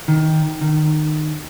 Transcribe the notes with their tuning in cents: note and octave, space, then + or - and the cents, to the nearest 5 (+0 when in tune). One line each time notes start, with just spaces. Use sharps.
D#3 +10
D#3 -20